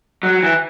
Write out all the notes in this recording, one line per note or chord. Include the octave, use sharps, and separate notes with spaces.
F#3
E3